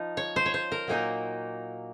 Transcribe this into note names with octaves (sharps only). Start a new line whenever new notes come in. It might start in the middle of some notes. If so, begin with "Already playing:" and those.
Already playing: F3 D#4
C#5
C5
C#5
C5
A#4
A#2 F#3 A#3 D#4